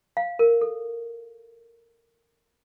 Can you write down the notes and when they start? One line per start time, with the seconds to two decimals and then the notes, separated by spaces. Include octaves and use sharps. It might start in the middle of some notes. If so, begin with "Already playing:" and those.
0.17 F5
0.39 A#4
0.61 A4